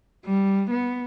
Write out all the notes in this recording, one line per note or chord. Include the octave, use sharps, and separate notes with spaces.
G3
B3